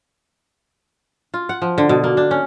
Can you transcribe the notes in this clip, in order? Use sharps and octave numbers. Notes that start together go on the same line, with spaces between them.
F4
F#5
F3
D3
B2
A#3
D4
C#4